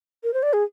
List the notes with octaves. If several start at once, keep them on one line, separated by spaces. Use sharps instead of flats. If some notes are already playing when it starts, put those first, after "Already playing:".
A#4
C5
D5
G#4